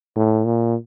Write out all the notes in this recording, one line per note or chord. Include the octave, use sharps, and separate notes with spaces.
A2
A#2